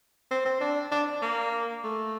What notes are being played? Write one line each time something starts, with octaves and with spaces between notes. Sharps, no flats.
C4
C4
D4
D4
A#3
A3